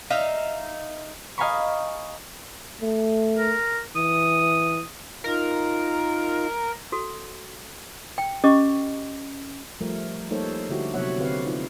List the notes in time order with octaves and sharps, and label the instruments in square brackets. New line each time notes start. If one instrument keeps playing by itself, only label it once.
[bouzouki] D#4 E5 F5
[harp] D#5 F5 G#5 A#5 B5 C#6
[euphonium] A3
[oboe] A#4
[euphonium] E3 [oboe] D#6
[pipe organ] D#4 F4 [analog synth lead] A#4
[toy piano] F#4 A4
G5
C#4 G4 D#5 C#6 D6
[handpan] F3 G3 A3 A#4
G3 A#3 D#4 A4 C5 C#5
D3 E4 F#4 G4
C3 F#3 B3 C#5 E5 F#5
D3 C4 G4 B4 F5
D#4 F4